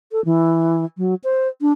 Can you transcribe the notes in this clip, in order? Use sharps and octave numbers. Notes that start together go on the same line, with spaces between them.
A4
E3
F#3
C5
D4